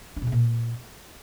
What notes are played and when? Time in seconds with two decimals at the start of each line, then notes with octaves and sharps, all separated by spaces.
0.16 D4
0.22 B2
0.27 C#3
0.32 A#2